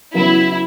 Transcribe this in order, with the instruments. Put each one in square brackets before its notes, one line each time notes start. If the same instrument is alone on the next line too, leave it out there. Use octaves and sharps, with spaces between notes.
[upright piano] C#3 F#3 B3 [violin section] E4